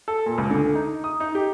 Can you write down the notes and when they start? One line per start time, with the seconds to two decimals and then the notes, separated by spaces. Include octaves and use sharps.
0.08 A4
0.26 A#2
0.38 C#2
0.50 D3
0.75 D#4
1.04 D#6
1.20 D#4
1.35 G4